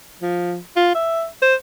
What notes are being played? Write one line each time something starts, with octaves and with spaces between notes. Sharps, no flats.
F3
F4
E5
C5